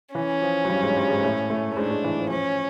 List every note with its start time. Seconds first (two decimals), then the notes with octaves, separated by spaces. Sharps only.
0.15 E3 C#4
0.42 F3
0.65 F#3
0.69 G2 G3
0.83 G#2 G#3
0.96 G2 G3
1.10 G#2 G#3
1.23 A2 A3
1.50 A2 A3
1.71 A3
1.77 G#2 G#3 D4
1.91 G#2 G#3
2.04 E3
2.18 F3
2.30 F3 C#4